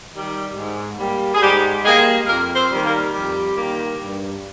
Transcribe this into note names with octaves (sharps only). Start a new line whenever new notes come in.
D#3 G3
G#2
G3 A#3
G#4
G#2 G3 G4
G3 G#3 A#3 G#4
F2 A#3 A#4
C4 C5
D#3 G3 A#3
A#3 A#4
F2 G3 G4
D#3 G3 A#3
G2